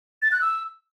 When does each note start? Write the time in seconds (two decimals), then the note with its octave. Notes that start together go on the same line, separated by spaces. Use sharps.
0.22 A6
0.32 F#6
0.41 E6